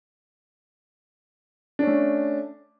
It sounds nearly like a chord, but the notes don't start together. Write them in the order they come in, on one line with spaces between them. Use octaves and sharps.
D4 C#4 A3